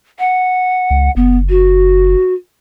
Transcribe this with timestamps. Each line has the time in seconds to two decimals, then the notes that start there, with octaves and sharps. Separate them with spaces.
0.19 F#5
0.90 C#2
1.16 F#1 B3
1.49 F#4